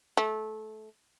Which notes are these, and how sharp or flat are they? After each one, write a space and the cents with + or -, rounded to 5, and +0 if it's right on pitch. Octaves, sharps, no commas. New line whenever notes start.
A3 -20